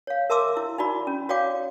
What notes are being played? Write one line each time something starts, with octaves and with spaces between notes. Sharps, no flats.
C#5 F5
A#4 E5 A5 C6 D6 E6
E4
D#4 E4 F#4 D5 B5
C#4
F#4 C#5 D5 F5 G5 D6